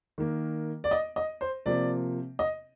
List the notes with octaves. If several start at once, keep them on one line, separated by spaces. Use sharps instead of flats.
D#3 A#3
D5
D#5
D#5
C5
C3 F3 A#3 D5
D#5